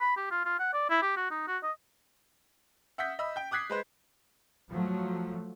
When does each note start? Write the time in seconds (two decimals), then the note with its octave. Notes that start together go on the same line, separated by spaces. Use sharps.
0.01 B5
0.17 G4
0.31 F4
0.46 F4
0.59 F#5
0.73 D5
0.90 E4
1.02 G4
1.17 F#4
1.31 D#4
1.48 F#4
1.63 D#5
2.98 E5 F#5 D#6 E6 G6 B6
3.19 D#5 E5 B5 E6
3.36 G5 G6
3.51 D6 D#6 F#6 G#6 B6 C7
3.70 G#3 B4 C5
4.71 F3 F#3 A3